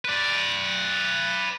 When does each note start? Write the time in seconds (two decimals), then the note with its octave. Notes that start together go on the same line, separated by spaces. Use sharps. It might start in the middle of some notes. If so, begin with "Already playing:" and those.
0.05 B4 D5